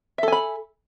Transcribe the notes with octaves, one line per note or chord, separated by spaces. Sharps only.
A4 E5 G#5 B5